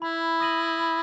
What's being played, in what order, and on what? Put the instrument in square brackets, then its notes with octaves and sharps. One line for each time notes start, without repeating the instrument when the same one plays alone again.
[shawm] E4 [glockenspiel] B5
[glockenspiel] D#6 A#6 D#7 F#7
B5